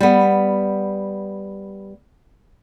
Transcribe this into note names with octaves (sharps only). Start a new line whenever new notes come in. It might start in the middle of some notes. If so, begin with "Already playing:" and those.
G3 B3